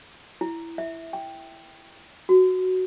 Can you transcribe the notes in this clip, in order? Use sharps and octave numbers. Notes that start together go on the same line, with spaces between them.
E4
E5
G5
F#4